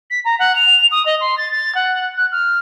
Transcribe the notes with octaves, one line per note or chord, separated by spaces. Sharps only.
B6
A#5
F#5
F7
D#6
D#5
C6
A6
A6
F#5
F#6
F6